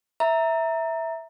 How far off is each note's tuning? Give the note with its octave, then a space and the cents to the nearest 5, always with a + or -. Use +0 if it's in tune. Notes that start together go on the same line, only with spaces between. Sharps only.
E5 -5 A#5 +0